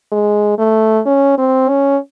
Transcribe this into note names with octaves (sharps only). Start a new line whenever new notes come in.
G#3
A3
C#4
C4
C#4